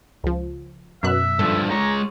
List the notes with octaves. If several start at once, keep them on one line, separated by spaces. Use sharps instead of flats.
C#2 F3
F#2 B2 E5 F#6
G2 F3 A4
G#3 C#5 A#5